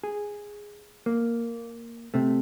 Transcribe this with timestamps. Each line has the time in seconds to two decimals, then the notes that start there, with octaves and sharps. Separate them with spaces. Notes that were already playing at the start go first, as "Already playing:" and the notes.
0.03 G#4
1.06 A#3
2.14 C3 A3